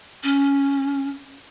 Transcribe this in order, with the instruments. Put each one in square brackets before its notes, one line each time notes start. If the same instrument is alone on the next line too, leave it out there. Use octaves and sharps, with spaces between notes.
[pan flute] C#4